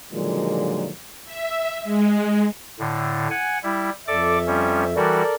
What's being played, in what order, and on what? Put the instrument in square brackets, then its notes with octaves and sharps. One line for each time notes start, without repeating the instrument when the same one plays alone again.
[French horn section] A#2 D3 D#3 F3 F#3 G#3
[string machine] E5
G#3
[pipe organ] A2 D3
F#5 G#5
G3 E4
[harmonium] F2 E5 [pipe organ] A4 D5 D6
[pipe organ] F3 G3 C#4
[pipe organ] E3 G3 F#4 [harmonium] A4 A#4 D5